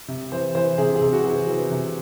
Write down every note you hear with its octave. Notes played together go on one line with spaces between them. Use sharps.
C3
E3 C5
E3 C5
C3 G#4
G#4
C3
F#4
E3
E3
C3